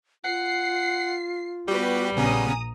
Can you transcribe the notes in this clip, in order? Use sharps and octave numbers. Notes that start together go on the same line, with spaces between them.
F4 F#5 C7
G3 B3 F#4 G4 B4
A#1 C#3 B3 C#4 G#5 A#5 D#6